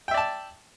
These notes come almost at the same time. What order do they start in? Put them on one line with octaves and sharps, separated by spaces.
G5 E5 D5 A5